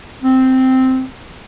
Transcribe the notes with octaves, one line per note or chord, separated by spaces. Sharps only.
C4